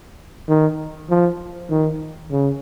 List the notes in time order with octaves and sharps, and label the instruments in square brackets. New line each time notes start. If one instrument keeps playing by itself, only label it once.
[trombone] D#3
F3
D#3
C#3